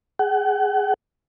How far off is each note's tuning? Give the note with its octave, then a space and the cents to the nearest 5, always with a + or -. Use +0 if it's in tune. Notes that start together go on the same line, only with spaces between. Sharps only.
G#4 +0 F#5 +40